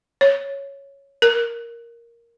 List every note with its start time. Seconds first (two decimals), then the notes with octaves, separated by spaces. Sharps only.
0.21 C#5
1.22 A#4